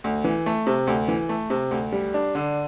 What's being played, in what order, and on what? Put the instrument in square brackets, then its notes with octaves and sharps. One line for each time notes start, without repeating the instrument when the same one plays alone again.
[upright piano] D2
E3
A3
C3
D2
E3
A3
C3
D2
G3
D4
D3